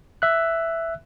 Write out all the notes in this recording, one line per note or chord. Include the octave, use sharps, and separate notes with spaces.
E5 F#6